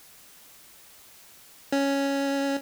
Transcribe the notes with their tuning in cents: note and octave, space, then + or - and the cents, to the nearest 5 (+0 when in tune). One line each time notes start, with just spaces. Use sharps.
C#4 +0